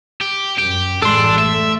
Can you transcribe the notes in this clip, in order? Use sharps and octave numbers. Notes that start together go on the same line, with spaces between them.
G4
F#2 G4
A1 G#3 D4 A4 C6
A3 E5